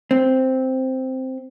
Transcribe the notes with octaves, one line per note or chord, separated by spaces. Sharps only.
C4